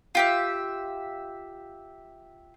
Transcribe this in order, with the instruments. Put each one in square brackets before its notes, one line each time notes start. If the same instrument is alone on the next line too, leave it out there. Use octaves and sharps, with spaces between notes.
[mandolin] F4 G4 E5